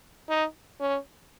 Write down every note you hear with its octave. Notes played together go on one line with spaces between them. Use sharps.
D#4
C#4